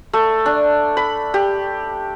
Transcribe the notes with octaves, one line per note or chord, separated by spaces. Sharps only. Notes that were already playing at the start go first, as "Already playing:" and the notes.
A3
D4
B5
G4